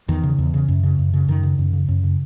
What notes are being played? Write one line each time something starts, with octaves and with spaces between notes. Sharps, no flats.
E2 D#3
C#3
E2
C#3
F#2
C#3
F#2
C#3
F#2 D#3
C#3
F#2
C#3
F#2
C#3